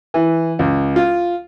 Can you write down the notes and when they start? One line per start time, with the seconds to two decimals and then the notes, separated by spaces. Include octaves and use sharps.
0.14 E3
0.59 C#2
0.96 F4